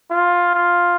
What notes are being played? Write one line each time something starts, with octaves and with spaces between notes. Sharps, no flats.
F4
F4